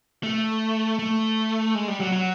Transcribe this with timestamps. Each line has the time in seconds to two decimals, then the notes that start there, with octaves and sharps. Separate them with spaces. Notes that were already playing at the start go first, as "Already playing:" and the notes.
0.23 A3
0.99 A3
1.75 G#3
1.88 G3
2.00 F#3
2.12 F#3